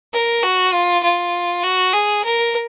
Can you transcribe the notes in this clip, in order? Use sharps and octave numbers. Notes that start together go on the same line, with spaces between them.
A#4
F#4
F4
F4
F#4
G#4
A#4